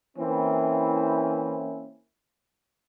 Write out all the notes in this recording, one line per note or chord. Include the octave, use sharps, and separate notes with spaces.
E3 A#3 C4 C#4 E4